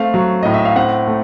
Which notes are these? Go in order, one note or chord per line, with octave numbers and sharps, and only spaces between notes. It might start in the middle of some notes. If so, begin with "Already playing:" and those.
Already playing: A3 C4 F5
F#3
A2 D#5
E5
F5
C4 F#5
A3